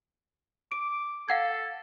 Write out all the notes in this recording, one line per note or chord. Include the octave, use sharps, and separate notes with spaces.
D6 D7
A4 F5 F#5 G#6